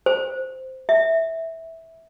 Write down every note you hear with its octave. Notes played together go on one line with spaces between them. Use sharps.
C5
E5